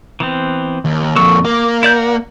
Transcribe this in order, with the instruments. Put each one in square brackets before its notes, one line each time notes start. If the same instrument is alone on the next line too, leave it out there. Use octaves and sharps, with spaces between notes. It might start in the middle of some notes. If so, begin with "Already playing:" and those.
[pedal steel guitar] E3 B3 C4
[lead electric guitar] D#2
[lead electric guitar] F2 A#3 [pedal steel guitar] A4 C#6 E6
[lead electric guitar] A#3 [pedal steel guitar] D6
[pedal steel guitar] E4 D5 G6
D5 F5 F#5